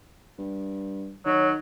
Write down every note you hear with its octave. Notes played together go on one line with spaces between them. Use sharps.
G2
D#3 F#3 C#5